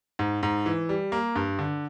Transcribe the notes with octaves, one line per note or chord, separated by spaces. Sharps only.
G#2
G#2
E3
G3
A#3
G2
D3